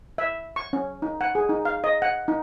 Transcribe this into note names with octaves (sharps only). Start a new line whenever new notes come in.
E5
C#6
C#4
D#4
F#5
G#4
D#4
F5
D#5
F#5
D#4